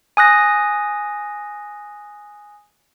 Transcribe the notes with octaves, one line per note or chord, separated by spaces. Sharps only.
G#5 D#6 F#6 A#6